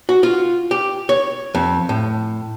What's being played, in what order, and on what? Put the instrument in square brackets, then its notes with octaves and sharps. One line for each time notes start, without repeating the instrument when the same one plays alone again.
[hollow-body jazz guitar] F#4
F4
G4
C#5
F2
A2